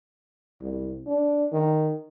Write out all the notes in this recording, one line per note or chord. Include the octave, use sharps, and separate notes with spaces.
C2
D4
D#3